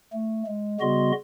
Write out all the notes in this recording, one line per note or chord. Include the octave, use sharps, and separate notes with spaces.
A3
G#3
C#3 G3 B3 F#4 D#5 C6